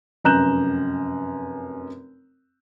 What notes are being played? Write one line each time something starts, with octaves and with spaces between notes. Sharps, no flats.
F1 F#2 A#5 F#6 G6 E7